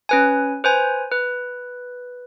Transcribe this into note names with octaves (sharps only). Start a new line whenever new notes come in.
C#4 B4 G#5
B4 C5 G#5
B4